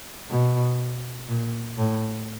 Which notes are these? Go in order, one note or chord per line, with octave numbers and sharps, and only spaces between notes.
B2
A#2
A2